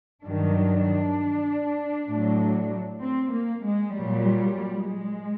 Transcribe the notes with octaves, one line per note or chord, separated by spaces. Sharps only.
G2 D#3 F#3 D4
A2 F#3
C4
A#3
G#3
A#2 F#3 G3
G#3